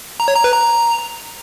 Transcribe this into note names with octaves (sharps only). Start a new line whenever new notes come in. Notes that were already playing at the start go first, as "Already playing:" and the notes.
A#5
C#5
A#5
B4
A#5